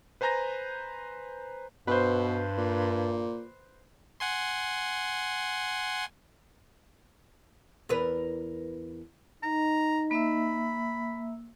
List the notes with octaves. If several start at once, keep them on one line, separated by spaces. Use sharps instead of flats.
B4 C5 G#5 A#5 G6 A#6
G2 B2 B4 C5
A#2
F#5 G#5 C6
E2 A#4 B4
D#4 A#5
A#3 E5 B5 E6